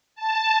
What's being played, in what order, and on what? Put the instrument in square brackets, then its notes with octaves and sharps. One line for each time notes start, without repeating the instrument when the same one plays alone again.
[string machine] A5